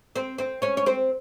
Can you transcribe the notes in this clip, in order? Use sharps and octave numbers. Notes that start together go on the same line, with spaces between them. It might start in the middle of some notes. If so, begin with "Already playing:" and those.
C4 C5
C4 C5
C#4 C#5
C#5
C4 C5